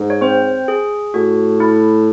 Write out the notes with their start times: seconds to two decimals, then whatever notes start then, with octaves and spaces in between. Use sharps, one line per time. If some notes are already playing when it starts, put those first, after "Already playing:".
Already playing: G#2
0.10 C#5
0.21 C4 C5
0.68 G#4
1.14 A2 F#4
1.60 E4